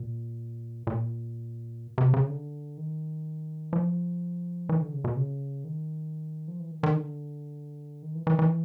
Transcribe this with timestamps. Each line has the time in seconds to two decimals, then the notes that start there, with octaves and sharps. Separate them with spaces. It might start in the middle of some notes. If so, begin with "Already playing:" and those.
Already playing: A#2
0.87 A#2
1.98 C3
2.14 C#3
2.29 D3
2.77 D#3
3.73 F3
4.69 E3
4.81 D3
4.93 C#3
5.04 B2
5.17 C#3
5.64 D#3
6.48 F3
6.60 E3
6.71 D#3
6.83 D#3
6.96 D3
8.03 D#3
8.15 E3
8.27 E3
8.39 E3